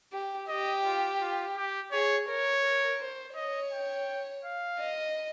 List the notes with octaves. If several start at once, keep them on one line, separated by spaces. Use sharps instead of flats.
G4
G4 D#5
F4
F4
G4
G#4 C#5
A#4 C#5
A#4
C5
C#5 D#5
G5
F5
D#5